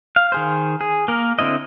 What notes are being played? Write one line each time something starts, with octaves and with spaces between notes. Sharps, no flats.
F5
D#3 G#4 C5
G#4
A#3 A#4
D3 C4 E4 D#5